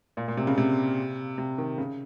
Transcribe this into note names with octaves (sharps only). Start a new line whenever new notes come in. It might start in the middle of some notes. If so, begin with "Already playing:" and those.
A#2
A#2
C3
C#3
C3
C3
D#3
C#3